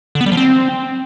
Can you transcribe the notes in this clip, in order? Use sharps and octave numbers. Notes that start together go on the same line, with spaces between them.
D3
B3
G3
F3
C4